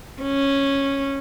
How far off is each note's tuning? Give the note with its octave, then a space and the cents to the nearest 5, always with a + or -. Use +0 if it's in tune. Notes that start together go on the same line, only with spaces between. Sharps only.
C#4 -10